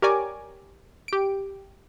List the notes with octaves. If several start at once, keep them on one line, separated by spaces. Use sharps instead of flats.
G4 A#4 C#5 D5 G#5 D6
G4 D7